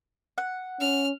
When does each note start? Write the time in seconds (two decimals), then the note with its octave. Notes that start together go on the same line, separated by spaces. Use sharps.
0.38 F#5
0.80 C#4 F6